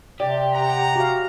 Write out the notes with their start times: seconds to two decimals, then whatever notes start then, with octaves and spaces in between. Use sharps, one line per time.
0.20 C3 G4 D5
0.52 F#5 A#5
0.96 F#4 F5